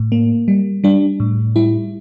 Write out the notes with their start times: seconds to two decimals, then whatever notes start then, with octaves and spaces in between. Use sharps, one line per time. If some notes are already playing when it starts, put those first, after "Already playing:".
Already playing: A2
0.12 A#3
0.48 G3
0.84 G3 D4
1.20 A2
1.56 G3 E4